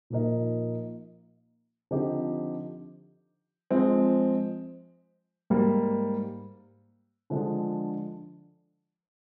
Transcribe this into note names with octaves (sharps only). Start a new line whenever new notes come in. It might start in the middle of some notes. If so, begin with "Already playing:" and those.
A#2 F3 A#3 D#4
D3 F3 C4 D#4 G4
F3 G#3 C4
G#2 G3 A#3
D3 F3 G#3 D4